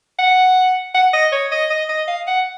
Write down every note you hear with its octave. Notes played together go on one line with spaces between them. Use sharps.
F#5
F#5
D#5
C#5
D#5
D#5
D#5
F5
F#5